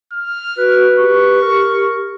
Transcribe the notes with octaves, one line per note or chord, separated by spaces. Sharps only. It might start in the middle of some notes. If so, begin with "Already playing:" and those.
F6
F#4 B4
G4 C#6
A#4